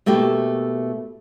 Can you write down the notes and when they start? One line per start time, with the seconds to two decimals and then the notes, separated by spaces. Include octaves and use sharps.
0.06 B2 A3 A#3 E4 G4